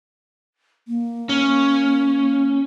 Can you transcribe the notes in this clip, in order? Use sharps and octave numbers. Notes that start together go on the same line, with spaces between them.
A#3
C#4